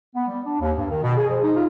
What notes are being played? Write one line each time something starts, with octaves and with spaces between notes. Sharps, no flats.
B3
G3
D4
D#2
G2
D#3
B2
G#4
F3
D#4
F4